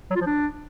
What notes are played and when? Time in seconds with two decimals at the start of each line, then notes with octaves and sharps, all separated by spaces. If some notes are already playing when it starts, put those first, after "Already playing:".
0.10 F#3
0.16 F4
0.21 F3
0.26 D4